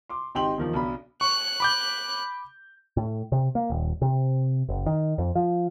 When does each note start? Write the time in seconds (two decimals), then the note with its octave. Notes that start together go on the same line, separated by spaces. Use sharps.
0.09 C6 D6
0.35 G#1 D#4 G4 G5 C6 F#7
0.58 E2 D#3 F3
0.73 B1 B2 D4 B5
1.21 C#6 F#6
1.60 B5 D6 G6
2.97 A2
3.32 C3
3.55 A#3
3.70 D#1
4.02 C3
4.69 F#1
4.86 D#3
5.18 F2
5.35 F3